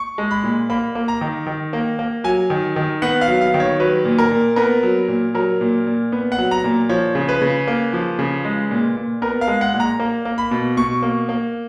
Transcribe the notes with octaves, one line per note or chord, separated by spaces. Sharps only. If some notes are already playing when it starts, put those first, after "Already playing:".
Already playing: C#6
G#3
B5
A#2
A#3 B5
A#3
A#5
D#3
D#3
A#3
A#3
F#3 G#5
D#3
D#3
B3 F#5
F5
F#3
F5
D#3
C#5
F#3 B4
A#2
A#4
A#2
B3 A#4
F#3
A#2
F#3 A#4
A#2
A#2
B3
F#5
F#3
A#5
A#2
F3 C#5
C#3
B4
C#3
A#3
F3
C#3
G#3
A#2
A#2
B3 A#4
F5
G#3
F#5
A#2
A#5
A#3
A#3
B5
B2
B2 C#6
A#3
A#3